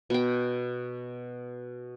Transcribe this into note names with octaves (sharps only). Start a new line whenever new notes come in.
B2 G5